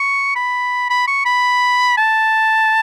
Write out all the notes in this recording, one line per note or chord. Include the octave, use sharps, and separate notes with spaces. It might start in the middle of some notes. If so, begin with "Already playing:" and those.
Already playing: C#6
B5
B5
C#6
B5
A5